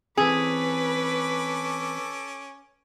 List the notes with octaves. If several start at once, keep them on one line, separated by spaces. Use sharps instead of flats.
E3 C4 C#4 G#4 A4 B4 D6